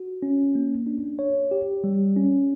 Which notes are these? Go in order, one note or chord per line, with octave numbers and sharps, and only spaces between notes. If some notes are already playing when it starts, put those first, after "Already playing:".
Already playing: F#4
C#4
A#3
D4
C#5
G4
G3
C#4